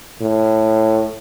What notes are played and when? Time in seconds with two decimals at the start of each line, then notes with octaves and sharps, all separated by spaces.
0.21 A2